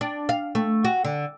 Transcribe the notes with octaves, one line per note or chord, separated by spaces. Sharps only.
D4
F5
A3
F#4
D3